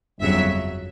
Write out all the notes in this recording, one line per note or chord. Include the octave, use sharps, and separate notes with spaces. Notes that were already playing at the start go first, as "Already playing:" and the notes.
G1 F2 C#3 F#3 E5